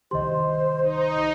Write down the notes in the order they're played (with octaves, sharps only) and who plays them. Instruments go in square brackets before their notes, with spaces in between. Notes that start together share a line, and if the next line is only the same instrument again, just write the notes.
[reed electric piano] C2 D#3 G4 [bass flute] C5 [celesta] D#5 C6
[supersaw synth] D#4